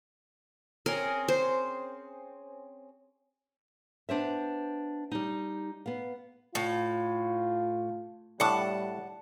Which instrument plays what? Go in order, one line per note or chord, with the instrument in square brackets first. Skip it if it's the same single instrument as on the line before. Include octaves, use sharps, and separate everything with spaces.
[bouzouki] C4 C#4 G#4 [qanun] A#4
[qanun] C5
[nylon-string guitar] B3 D4 C5 E5
G3 D#4
B3 F5
[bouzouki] A2 [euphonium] F4
[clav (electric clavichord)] A2 D4 [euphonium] G3 [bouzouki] F#5 A5